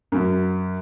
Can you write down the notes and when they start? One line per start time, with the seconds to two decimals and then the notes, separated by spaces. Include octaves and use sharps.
0.12 F#2